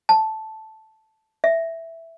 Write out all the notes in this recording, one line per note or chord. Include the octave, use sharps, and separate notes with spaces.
A5
E5